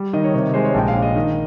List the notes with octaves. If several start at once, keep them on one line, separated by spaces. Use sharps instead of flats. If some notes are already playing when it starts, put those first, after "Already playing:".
Already playing: G3
D#3 D#5
C#5
C3 C#5
D#5
G#3 C5
C#5
A#1 G5
F5
A#1
D#5
D#3